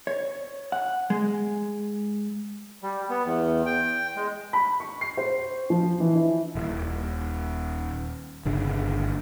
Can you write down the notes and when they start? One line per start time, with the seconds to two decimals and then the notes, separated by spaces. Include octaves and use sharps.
0.07 C#5
0.72 F#5
1.10 G#3
2.82 G3
3.10 B3
3.25 E2
3.66 G5
4.16 G#3
4.53 B5
4.80 C#6
5.01 C7
5.17 C5
5.70 F3
6.00 E3
6.15 E4
6.55 D#1
8.45 G1 C#3 D4